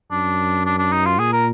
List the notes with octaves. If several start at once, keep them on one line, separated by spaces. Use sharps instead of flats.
F#2 D4
D4
D4
D#4
F4
A#2 G#4
A#4